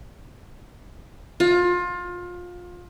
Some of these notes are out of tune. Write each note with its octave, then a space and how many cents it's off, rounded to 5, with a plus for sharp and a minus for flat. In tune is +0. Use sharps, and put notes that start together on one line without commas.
F4 +25